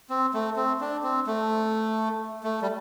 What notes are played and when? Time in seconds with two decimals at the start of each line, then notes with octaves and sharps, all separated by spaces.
0.10 C4
0.34 A3
0.56 C4
0.81 D4
1.04 C4
1.27 A3
2.44 A3
2.62 G3